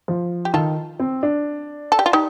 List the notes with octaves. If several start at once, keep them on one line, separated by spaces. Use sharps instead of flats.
F3
G4
D#3 F4 A4
C4
D4
A4
G4
F4
D#4 G4